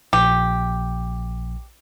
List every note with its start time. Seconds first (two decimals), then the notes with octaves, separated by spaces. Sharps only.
0.13 A#1 G4